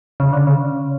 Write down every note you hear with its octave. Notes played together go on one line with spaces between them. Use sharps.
C#3
D3
C#3